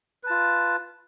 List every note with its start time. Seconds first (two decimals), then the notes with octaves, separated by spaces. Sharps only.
0.23 B4
0.27 A5
0.30 F4